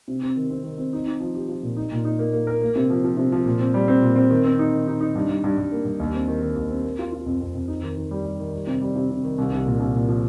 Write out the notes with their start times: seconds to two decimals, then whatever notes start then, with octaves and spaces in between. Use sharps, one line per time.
0.08 C3
0.21 C4
0.36 D#3
0.50 C4
0.64 D#3
0.78 C4
0.93 D#4
1.06 D#4
1.20 F3
1.34 G4
1.49 F3
1.63 A#2
1.77 D#4
1.92 A#2
2.05 D#4
2.19 A#3
2.33 A#3
2.47 A#4
2.61 A#3
2.76 C3
2.90 F3
3.04 F3
3.17 C3
3.32 F3
3.46 A#2
3.60 C4
3.74 G3
3.88 C4
4.02 A#2
4.16 C4
4.30 D#3
4.44 C4
4.59 D#4
4.73 D#3
4.87 D#4
5.01 D#4
5.15 G2
5.28 G2
5.44 G2
5.58 G2
5.72 A#3
5.85 G2
6.00 D#2
6.14 C4
6.28 D#3
6.42 D#3
6.56 D#2
6.69 C4
6.84 A#3
6.99 F4
7.12 F4
7.26 F2
7.41 F2
7.55 F2
7.68 D#4
7.82 D#3
7.97 D#3
8.11 G3
8.25 G3
8.39 D#3
8.53 G3
8.67 C3
8.81 G3
8.96 C3
9.10 C3
9.23 D#3
9.38 C2
9.52 C2
9.66 A#2
9.79 C2
9.94 A#2
10.08 F3